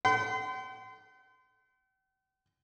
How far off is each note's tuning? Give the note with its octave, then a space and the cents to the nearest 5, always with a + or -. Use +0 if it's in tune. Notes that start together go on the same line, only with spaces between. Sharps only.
G5 -45 C6 -35